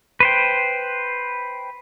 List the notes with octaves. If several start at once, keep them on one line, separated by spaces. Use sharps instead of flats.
B4 C5 G5